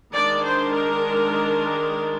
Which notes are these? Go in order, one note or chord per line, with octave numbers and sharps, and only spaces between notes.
D#3 G#3 D4 D5
C5
A#4